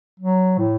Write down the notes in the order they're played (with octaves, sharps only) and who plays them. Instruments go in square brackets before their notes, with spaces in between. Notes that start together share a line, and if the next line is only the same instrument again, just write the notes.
[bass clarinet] F#3
A2